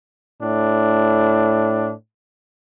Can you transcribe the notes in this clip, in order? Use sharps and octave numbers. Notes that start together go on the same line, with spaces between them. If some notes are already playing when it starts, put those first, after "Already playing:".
A2 D4